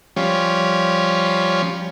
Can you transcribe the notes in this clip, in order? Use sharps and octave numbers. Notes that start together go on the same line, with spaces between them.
F3 G3 C#4